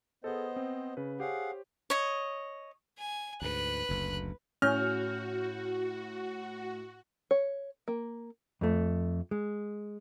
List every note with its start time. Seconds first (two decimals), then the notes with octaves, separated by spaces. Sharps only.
0.24 B3 G#4 A4 C5 D#5
0.56 C4
0.97 C#3 B4
1.20 G4 G#4 C5 C#5 F5 F#5
1.90 C#5 D#5
2.98 G#5
3.42 D2 G#2 B4 F#6
3.89 F#1 D2
4.62 A2 C#4 F#4 F6 G6
7.31 C#5
7.88 A#3
8.61 F2 A3
9.31 G#3